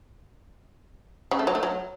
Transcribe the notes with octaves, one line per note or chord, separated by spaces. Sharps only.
C#3
A3
F#3
A3
F#3